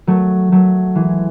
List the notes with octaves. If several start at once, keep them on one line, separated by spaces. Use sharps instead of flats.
F#3 A3
F#3 A3
E3 G#3